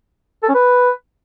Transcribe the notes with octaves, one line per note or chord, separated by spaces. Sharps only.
A4
C#4
B4